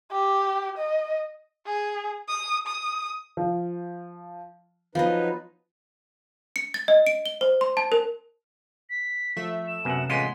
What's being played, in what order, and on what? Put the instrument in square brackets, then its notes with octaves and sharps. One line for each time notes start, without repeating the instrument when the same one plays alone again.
[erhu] G4
D#5
G#4
D#6
D#6
[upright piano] F3
[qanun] F3 B3 D#5 [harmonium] F#3 D#4 B4 [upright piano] F5
[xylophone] C#7
A6
D#5
D7
G7
C5
C6
A5
A#4
[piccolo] B6
[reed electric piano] F3 [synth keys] A3 E5
[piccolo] E7
[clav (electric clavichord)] F#2 F#5 [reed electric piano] C3 B3 C#4
[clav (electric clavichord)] A1 G#3 F4 [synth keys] F#5 C6 [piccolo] B6